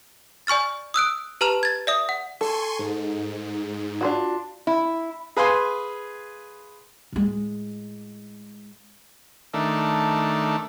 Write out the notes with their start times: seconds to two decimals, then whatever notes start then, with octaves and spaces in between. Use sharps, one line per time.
0.47 D5 G#5 C#6 F6 A6
0.94 D#6 E6 F#6 D7
1.41 G4 B4 A5 A#5 F6 F7
1.63 G#6 A6
1.87 D5 E5 D#6
2.09 F#5
2.41 A4 G#5 C6 C#6
2.79 G#2
4.01 D4 F4 F#4
4.67 E4
5.37 G#4 B4 F5 G#5 C6
7.13 A2 G#3
9.54 D#3 A3 D4